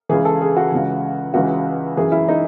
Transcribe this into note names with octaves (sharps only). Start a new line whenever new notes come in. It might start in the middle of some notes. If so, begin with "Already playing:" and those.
C#2 C#3 E3 G#4
A4
G#4
F#4
C#2 C#3 E3
C#2 C#3 E3 F#4
F#2 E3 G#4
E4
D#4